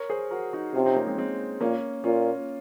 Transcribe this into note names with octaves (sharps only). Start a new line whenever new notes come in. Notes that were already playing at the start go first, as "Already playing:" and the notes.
Already playing: A#4 C#5
G#4 C5
F#4 A#4
D#4 F#4
C3 C#4 F4
C4 D#4
A#3 C#4
G#3 C4
G#3 C4
A#2 A#3 C#4
A#2 C#4 F4